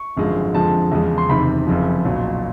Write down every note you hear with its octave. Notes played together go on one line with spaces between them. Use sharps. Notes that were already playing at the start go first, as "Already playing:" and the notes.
Already playing: C#6
G#1 F#2 D3 F3 G#3
F2 D3 F3 G#3 A5
E2 C#3 F3 G#3
C6
F#1 E2 C3 D#3 B5
F#1 F2 C#3 F3
B1 A#2 F#3